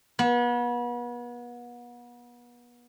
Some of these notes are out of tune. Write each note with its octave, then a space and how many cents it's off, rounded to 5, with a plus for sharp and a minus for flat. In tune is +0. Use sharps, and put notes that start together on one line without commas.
B3 -35